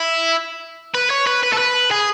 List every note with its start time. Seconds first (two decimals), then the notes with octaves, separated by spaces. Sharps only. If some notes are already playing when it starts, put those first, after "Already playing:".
Already playing: E4
0.94 B4
1.10 C#5
1.27 B4
1.43 B4
1.53 A4
1.58 B4
1.91 G#4